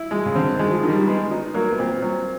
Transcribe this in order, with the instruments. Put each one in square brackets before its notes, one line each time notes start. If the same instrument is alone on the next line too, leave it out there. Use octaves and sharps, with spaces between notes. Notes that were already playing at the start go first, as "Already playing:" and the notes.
Already playing: [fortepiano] E4
G#3
[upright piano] C#3
[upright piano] D3 [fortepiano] C4
[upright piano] D#3
[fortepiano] G#3
[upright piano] F3
[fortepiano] D#3
[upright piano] G3
[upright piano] G#3 [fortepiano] B3
[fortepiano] D#4
[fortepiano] F#3 [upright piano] A#3
[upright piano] B3
[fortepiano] A#2 [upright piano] C4
[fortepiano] F#3